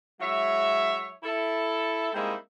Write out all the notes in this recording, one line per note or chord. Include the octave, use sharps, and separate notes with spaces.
F#3 G#3 E4 C#5 E5
E4 A4
G3 G#3 A#3 C4 D#4 E4